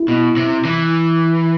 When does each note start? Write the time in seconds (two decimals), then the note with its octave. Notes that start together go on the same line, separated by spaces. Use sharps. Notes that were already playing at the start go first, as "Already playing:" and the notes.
Already playing: E4
0.08 B2
0.37 C3
0.65 E3